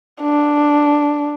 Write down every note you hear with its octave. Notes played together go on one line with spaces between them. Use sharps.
D4